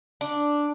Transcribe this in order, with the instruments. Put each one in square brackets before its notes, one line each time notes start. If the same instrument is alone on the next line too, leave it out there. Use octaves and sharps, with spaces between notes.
[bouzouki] D4